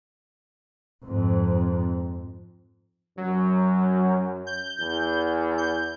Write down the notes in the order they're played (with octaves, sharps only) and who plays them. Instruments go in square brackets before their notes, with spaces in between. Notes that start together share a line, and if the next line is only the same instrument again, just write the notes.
[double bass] F2 G#2
[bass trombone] F#2 [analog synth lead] F#3
[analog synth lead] G6
[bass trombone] E2
[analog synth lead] G6